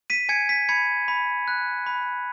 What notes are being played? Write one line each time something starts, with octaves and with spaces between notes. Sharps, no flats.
B6 D#7
G#5 G#6 C#7
B6
B5 G#6 C#7
B5
F#6
B5